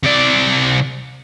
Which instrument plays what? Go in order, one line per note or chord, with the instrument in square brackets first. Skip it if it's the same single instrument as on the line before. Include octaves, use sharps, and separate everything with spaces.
[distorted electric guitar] C3 D5